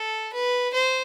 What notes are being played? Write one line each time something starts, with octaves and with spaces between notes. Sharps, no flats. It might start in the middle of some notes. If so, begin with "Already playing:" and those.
Already playing: A4
B4
C5